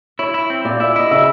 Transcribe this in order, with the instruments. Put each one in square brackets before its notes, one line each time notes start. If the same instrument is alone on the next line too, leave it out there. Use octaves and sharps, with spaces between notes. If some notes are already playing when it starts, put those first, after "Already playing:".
[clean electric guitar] E4 [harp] C#5
[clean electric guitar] E4
C4
[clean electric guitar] A#2 [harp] D5
[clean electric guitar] E4 [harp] E5
[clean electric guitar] E4 [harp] D#5
[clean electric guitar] C#3 [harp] E5